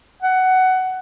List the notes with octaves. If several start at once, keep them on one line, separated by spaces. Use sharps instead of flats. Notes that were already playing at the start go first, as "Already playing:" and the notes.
F#5